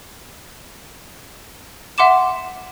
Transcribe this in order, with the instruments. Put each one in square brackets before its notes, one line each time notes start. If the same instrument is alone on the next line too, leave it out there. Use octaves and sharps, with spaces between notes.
[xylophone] E5 F#5 C6 D6 E7